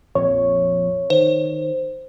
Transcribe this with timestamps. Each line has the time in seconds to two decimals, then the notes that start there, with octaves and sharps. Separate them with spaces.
0.15 A#1 F2 C#5
1.10 D#3 C5